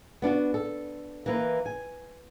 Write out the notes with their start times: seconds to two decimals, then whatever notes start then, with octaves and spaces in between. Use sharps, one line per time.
0.22 B3 D4 F4 F#4
0.54 A4
1.26 E3 A#3 B4
1.66 G#5